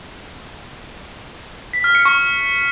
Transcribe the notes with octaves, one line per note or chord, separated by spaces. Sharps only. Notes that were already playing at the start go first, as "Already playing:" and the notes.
B6
F6
C#7
C#6